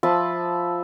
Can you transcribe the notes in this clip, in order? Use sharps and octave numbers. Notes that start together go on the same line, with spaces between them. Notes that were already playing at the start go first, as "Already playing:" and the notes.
F3 E5 A5 B5